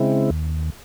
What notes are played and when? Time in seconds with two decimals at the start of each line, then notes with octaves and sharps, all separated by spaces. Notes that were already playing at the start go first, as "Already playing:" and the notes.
Already playing: C#3 G#3 C4 E4
0.30 D#2